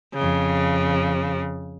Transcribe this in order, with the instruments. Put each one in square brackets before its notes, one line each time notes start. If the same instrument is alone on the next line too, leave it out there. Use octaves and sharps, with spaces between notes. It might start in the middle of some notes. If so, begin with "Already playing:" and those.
[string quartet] F2 C#3